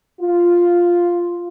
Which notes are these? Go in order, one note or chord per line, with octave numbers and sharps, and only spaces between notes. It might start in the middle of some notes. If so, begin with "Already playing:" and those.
F4